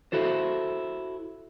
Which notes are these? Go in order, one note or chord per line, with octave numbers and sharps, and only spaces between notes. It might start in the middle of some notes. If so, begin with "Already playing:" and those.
E4 F#4 A4 C5